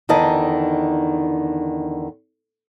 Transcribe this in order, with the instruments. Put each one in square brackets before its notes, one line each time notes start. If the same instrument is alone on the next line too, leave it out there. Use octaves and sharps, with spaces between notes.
[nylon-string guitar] E2 D3 D#3 D#5 A5